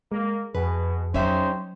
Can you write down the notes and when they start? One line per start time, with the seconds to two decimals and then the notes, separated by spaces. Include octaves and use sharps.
0.12 G#3 A#3
0.55 F2 B2 G#4 B4
1.14 F#3 C#4 D#4 G4 C5 E5